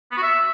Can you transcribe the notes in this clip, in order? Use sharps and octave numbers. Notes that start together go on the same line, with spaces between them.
B3
F#4
E5